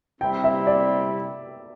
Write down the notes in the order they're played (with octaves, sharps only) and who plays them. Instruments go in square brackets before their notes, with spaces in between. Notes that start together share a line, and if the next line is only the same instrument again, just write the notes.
[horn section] C3 G3 C4 E4 [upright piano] G5
[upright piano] E5
D5